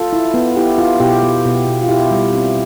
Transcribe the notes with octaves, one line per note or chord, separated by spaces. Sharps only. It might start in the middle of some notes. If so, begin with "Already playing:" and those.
Already playing: F4 A4
E4
B3
E4 G4
E4 F4
B2 E4 G4
B3
B2
B2
F4
E4 G4
G3
C4